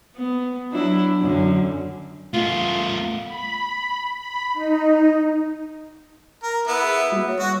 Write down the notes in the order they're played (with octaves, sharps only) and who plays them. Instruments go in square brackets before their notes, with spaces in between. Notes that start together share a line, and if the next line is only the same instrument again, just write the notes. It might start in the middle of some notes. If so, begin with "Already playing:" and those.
[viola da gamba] B3
F#3 D4 E4
F#2 D3
[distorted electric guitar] A3 B3 [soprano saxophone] F4
[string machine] B5
B5
D#4
[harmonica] A#4
B3 E4
[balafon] G#4
G3 A#3 F#4
A#3 C#5
[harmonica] F#4